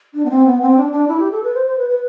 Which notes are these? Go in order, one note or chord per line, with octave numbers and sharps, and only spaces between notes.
D4
B3
C4
B3
C4
D4
D4
E4
G4
A4
B4
C5
C5
B4
B4